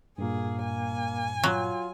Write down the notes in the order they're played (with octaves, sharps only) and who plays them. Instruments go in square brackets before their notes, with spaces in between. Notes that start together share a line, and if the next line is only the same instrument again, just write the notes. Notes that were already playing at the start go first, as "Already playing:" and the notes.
[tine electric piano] G2 A#2 [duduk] A#3 [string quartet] G#4
[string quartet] G#5
[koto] F#3 [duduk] F4